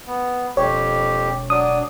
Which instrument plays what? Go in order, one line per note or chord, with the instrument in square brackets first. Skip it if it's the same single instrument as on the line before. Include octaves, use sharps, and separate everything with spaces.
[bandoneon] B3
[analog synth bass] E1 [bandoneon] F2 G4 [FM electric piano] C#5
[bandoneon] F#3 D4 [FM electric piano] D#6